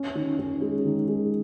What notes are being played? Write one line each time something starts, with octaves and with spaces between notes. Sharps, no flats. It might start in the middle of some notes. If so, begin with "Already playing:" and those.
Already playing: C#4
D#3
C#4
G#3
D#3
G#3